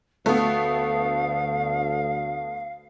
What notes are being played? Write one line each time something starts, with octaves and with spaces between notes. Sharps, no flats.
D2 A3 B3 F5